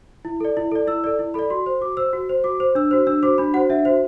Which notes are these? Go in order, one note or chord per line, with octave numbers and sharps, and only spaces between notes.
E4
A4 D5
E4
A4 D5
E4 E6
A4 D5
E4
A4 D5 B5
F#4 C6
C5
F#4 D6
C5 E6
F#4
C5
F#4 D6
C5
D4 E6
F#4 C5
D4 E6
F#4 C5 D6
D4 B5
F#4 C5 F#5
D4 E5
F#4 C5